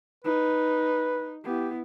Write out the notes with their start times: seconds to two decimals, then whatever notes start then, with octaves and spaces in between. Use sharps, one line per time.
0.24 D#4 B4
1.44 B3 E4 G4